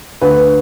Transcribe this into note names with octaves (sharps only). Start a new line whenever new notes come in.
D2 B4